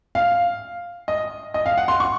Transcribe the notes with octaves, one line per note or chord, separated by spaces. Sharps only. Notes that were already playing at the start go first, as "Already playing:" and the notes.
F5
D#5
D#5
F5
F#5
C6
C#6